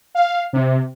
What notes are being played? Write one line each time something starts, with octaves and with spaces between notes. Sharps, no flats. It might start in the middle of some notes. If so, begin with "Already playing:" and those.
F5
C3